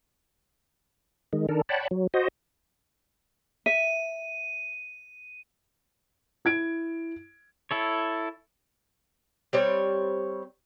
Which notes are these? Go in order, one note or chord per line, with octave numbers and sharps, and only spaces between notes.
D#3 G#3
D#3 D4 A4 A#4
C#5 D5 F#5 G5 A5 B5
F#3
F#4 C5 D#5
E5 D#7
E4 G#6 D7
E4 A4 C#5
G3 C4 C#5